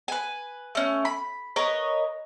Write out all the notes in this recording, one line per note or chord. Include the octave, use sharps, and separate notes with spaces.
B4 G#5
A3 C#4
B5
A#4 B4 C#5 D#5